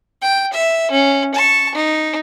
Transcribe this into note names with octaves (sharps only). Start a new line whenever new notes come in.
G5
E5
C#4
A5 C#6
D#4